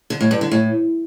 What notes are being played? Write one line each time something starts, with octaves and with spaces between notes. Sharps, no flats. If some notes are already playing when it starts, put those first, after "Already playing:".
D3
A2
G2
D3
A2